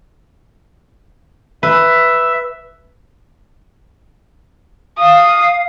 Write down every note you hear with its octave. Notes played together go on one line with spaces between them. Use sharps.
B4 E5
F5 D#6